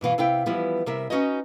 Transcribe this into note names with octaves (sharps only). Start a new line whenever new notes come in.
G2 B2 E3 F5
C3 E4 F5 G5
E3 F3 G3 B3 E4
C3 G3 A#4 E5
C#4 D#4 F#4 B4 C#5 D#5